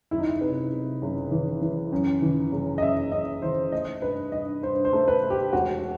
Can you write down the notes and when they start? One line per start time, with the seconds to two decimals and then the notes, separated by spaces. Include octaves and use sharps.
0.11 F#1 E4
0.18 D#4
0.26 E4
0.41 C3 B4
0.71 C3
1.02 F#1
1.31 E3
1.62 E3
1.92 F#2
2.22 E3
2.52 F#1
2.78 D#5
2.82 F#2 E5
3.12 F#2 D#5
3.42 E3 C5
3.72 A3 D#5
4.02 G2 B4
4.32 G2 D#5
4.63 G2 C5
4.85 C5
4.93 A3
5.08 B4
5.23 A3
5.30 G4
5.53 E1 F#4